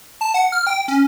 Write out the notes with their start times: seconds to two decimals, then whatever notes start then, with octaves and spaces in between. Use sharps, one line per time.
0.21 A5
0.34 F#5
0.52 F6
0.67 G5
0.88 C#4